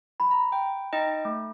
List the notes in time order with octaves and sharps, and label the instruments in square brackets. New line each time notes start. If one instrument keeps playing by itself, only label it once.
[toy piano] B5
[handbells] A#5
G5
D#4 D#5 G5
A3